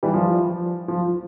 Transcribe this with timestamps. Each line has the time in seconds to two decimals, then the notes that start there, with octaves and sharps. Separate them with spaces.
0.03 E3 G3
0.13 F3
0.88 F3